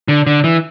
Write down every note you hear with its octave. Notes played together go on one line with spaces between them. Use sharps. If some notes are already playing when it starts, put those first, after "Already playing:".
D3
D3
E3